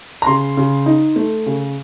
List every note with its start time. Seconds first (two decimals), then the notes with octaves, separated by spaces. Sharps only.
0.22 A#5
0.26 C#3 C6
0.57 C#3
0.86 D#4
1.16 A3
1.46 C#3